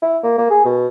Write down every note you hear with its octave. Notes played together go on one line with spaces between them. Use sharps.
E4
A#3
A#3
G#4
B2